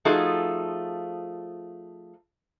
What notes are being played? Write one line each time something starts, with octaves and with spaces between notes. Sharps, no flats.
F3 A3 D#4 F4 F#4 G#4